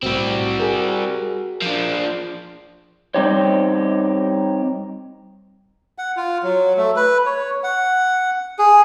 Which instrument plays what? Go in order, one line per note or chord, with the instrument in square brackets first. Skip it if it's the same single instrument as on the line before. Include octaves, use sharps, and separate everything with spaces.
[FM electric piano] B1 A2 [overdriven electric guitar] G3 C4 [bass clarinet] F#4
[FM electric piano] G#4 A#4
[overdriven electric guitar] F3 D4
[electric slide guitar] G3 C4 D#4 G4 C5 C#5
[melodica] F#5
F4
F#3
A3
B4
C#5
F#5
G#4